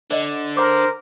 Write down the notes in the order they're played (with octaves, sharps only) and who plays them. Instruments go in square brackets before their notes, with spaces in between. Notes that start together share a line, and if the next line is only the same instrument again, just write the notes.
[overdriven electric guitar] D3 [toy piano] C5 D5 D#5
[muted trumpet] A#4 [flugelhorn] C5 [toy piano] F#5 D6